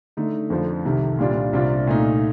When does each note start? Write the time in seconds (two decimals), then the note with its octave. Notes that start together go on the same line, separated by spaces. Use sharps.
0.17 D3 A3 D#4
0.50 F2 D3 F3
0.85 C2 C3 D#3
1.19 A#2 G3 D4 F4
1.53 C2 C3 G3 D4 F4
1.87 A#2 A3 D#4